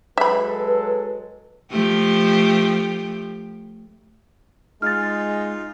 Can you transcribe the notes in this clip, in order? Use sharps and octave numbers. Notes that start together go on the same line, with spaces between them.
F#3 G#3 A4 B4 E5 B5
F3 A3 G4
G#3 D#4 F4 F6 A6